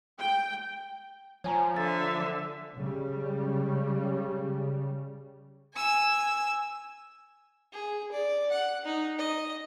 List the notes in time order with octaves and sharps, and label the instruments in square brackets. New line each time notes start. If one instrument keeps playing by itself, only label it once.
[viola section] G5
[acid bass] F3 [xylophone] C#5 G#5 A#5
[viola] D3 E5 [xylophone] A6
[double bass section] C#3 G3
[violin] G#5 E6
[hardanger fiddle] G#4
D5
F#5
D#4
D#5